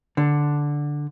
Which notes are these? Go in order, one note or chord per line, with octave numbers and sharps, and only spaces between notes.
D3